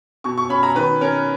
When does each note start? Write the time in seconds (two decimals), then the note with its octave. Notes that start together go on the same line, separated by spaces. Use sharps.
0.24 B2 C#6
0.38 C#6
0.49 C#4 B5
0.63 A#5
0.75 D#3 B4
1.01 C#4 A#4